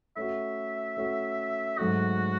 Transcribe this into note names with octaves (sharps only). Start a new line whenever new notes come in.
A3 C#4 F#4 E5
A3 C#4 F#4
G#2 F#3 A3 F#4